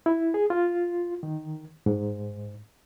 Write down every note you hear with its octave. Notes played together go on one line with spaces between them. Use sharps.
E4
G#4
F4
D#3
G#2